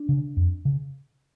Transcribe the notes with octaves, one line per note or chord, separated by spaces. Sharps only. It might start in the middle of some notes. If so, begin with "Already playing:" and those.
Already playing: D4
C#3
F2
C#3